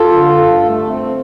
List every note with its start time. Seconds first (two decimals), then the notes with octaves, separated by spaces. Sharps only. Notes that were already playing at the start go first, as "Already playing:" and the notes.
Already playing: F4 A4
0.12 D3
0.38 G2
0.63 A3
0.87 C4